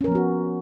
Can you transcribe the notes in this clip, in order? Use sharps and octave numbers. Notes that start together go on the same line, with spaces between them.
F3 B3 C#4 F#4 A#4